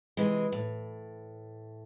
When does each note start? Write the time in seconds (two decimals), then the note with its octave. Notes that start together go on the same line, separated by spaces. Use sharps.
0.17 C3 E3 G#3
0.52 A2